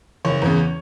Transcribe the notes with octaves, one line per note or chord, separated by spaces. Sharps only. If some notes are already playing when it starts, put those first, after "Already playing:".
F#1 C#5
E2 C#3